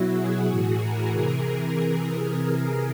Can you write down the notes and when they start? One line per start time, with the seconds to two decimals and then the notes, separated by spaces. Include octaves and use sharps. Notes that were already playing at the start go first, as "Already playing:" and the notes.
Already playing: B2 F#3 E4 F#4
0.12 F#4 G#4
0.46 A2 E3
0.78 G#4 A#4
1.12 C3 E3 G#4 A#4